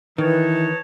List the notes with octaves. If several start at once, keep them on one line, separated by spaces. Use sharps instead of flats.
D#3 E3 D#4 B4 C#5 A5